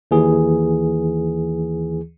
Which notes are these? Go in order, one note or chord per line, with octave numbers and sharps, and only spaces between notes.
D#2 E3 G#4